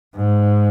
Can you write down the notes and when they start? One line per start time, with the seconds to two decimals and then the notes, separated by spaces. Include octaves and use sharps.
0.17 G#2